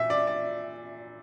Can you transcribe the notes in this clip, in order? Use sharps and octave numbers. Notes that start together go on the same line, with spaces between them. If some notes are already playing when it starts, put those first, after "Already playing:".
Already playing: A#2 E5
D5
D5